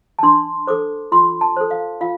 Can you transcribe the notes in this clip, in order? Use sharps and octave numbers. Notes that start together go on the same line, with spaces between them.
A5
D4 C6
A4 C5 D6
F4 C6
A5
A4 C5
F5
F4 F5